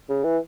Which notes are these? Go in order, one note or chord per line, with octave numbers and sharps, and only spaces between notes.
C#3
E3